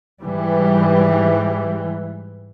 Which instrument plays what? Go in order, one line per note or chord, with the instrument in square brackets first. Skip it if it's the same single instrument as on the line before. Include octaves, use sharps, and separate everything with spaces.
[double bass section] G#2 E3 G3